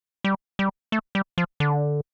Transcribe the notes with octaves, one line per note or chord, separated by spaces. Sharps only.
G3
G3
A3
G3
F3
D3